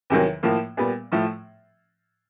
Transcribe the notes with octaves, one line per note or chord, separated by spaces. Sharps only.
E2 C3 D#3 F#3
A2 F3 A#3
A#2 G3 B3
A2 F3 A3